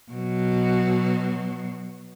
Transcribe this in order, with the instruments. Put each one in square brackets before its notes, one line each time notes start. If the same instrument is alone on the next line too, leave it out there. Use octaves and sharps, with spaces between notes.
[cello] B2 F#3